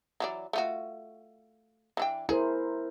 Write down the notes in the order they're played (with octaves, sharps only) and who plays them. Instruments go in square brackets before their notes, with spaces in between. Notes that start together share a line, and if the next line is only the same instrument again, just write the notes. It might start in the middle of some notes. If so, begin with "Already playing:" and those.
[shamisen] E3 F#3 D5
A3 F4 F#4
E3 D4 G5
[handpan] E4 A#4 C5 [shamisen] G#4